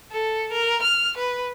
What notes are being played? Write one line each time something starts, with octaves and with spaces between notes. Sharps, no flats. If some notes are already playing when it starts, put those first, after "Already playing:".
A4
A#4
F6
B4